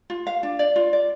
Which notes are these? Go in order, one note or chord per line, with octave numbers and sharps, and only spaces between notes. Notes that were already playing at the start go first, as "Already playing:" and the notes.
F4
F5
D4
D5
F4
D5